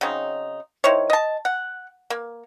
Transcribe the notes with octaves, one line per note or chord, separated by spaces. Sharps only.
C#3 F#3 C4 D#4
D#3 E4 C5 C#5
D#5 A5
F#5
A#3